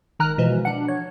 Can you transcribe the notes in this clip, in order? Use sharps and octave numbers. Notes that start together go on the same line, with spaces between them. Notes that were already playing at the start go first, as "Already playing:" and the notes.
G#1 D#3 A#5 F6 F#6
B2 E3 F3 G#3
D4 F#5
C#5